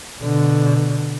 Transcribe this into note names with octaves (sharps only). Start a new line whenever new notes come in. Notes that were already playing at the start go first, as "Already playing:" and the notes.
B2 D3